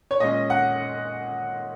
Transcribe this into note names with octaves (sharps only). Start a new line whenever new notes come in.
C#5
A#2 G#3 C#4 D#5
F#5